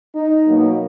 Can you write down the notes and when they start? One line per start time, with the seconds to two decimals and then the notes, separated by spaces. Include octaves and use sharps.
0.13 D#4
0.46 B2 F#3 A#3